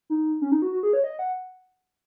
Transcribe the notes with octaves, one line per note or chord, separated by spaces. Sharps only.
D#4
C#4
D#4
F#4
F#4
G#4
C#5
D#5
F#5